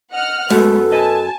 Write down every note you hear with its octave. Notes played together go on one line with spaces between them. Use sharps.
D#5 F#5 F6
F#2 G#3 A3 B3 A4
B4 D#5 G#5 A5